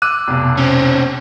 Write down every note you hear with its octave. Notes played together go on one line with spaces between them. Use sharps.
D6 E6 F#6 D#7
F1 B1
C4 C#4